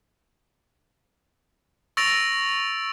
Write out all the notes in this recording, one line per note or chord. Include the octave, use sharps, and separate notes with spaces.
C#6 E6 A6 A#6 D7 F7